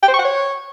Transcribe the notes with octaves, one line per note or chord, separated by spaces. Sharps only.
G5
C5
C#6
F#5
C#5